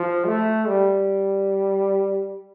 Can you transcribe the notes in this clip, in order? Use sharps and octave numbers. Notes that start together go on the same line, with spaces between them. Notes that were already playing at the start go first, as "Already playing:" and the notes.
Already playing: F3
A3
G3